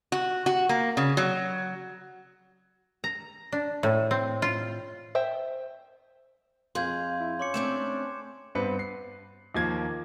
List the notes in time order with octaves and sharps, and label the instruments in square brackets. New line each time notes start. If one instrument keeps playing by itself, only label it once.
[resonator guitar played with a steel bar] F#4
F#4
A#3
C#3
F#3
[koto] A#5
D4
A2
C4
F4
[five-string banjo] C5 E5 G5
[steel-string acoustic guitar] F2 G#4 F5 [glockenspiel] C6 G6 G#6
[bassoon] E4
[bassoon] C#4 [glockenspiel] C6 D6 C#7
[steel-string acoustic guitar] A3 C4 D4 [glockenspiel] D6 E7
[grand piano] G2 B3 C4 B4 C#7
C7
D#2 F3 A#3 G#6